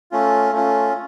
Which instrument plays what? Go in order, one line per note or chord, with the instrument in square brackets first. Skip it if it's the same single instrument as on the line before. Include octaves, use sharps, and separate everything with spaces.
[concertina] A3 C#4 F4
A3 C#4 F4